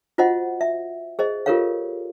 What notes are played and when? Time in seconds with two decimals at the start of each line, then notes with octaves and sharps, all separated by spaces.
0.18 F4 F#4 C5 D#5 F#5
0.61 E5
1.19 G#4 C5 D#5
1.46 F4 G4 A4 A#4 C#5 F5